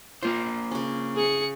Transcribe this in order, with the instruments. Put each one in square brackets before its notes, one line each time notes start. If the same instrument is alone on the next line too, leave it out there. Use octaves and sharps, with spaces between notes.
[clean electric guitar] A#3 C5 [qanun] F4
[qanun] C#3 C#4
[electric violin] G#4 C#7